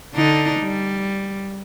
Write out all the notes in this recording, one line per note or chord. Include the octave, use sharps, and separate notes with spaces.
D3 D4 D#4
G3